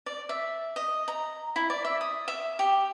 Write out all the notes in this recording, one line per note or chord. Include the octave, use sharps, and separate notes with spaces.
D5
E5
D#5
A#5
E4
D5
E5
D#6
E5
G4